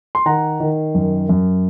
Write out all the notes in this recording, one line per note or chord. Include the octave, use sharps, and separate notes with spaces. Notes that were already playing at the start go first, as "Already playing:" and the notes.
C6
D#3 F#5 A#5
D#3
F#2
F#2